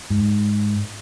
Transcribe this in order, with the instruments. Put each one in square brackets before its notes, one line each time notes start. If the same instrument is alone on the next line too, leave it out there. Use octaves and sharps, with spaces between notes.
[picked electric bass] G#2